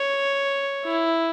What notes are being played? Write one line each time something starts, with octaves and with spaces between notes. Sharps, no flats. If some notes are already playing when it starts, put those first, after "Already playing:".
Already playing: C#5
E4